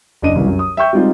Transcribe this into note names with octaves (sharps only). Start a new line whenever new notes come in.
F#1 D4 D#5 D#7
C2 E3
F#2
D#6
E5 G5 C#6 G6
G3 G#3 C4 D#4 F4